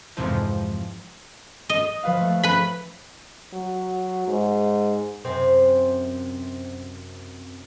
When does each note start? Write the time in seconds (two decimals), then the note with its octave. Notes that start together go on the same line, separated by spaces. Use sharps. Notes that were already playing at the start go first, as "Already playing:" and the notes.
0.17 F2 G#2 C3 E3 F3
1.69 D#5
2.03 F3 B4 F5
2.21 A3
2.43 B4 B5
3.53 F#3
4.28 G#2
5.24 F#2 C3 C4